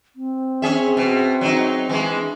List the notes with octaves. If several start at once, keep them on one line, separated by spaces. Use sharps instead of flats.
C4
C#4 G#4 E5
B2
F#3 D#4
E3 G#3
D4